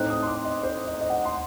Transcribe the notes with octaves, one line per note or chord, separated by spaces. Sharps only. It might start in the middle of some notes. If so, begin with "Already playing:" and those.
Already playing: A2 A3 C4 D#4 F#6
D#6
C6
D6
D#5
C5
D#5
D#5
F#5
C6